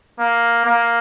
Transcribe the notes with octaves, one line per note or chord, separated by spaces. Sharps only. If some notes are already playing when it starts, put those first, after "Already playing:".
A#3
A#3